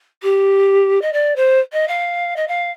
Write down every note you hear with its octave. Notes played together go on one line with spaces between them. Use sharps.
G4
D#5
D5
C5
D#5
F5
D#5
F5